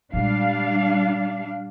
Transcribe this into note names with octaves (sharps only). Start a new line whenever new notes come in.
A#2 G3 G#3 D4 F5